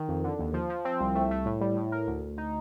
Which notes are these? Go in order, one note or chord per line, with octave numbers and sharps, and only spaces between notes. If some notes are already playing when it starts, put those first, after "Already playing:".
Already playing: D#3
F2
D3
D#2
F3
F3
C4
C2
A3
A3
A2
G3
A2
A#4
D2
D2
D#4